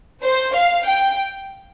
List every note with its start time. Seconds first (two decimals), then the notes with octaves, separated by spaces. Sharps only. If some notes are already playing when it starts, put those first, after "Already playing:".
0.24 C5
0.56 F5
0.87 G5